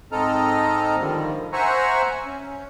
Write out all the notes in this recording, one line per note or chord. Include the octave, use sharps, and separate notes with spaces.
G#2 C4 A4 D#5 A#5 F6
D3 D#3 F3 G3
C5 E5 F#5 G#5 A#5 C#6
C#4